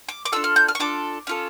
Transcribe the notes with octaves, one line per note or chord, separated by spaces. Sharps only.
D6
D6
D4 F4 A4 E6
F6
G6
F6
C#6
D4 F4 A4 D6
C#4 F4 A4